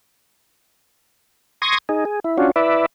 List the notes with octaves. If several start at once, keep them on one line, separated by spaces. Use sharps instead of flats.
C6 C#6 D#6 G#6 A#6
D#4 G#4
G#4
E4
C#4 D4 F4 F#4
E4 B4 D5 E5